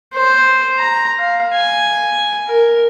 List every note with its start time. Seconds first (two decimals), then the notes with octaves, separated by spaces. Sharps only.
0.14 C5
0.79 A#5
1.19 F5
1.54 G#5
2.48 A#4